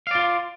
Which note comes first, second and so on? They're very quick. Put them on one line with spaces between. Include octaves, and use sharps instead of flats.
F5 D5 F4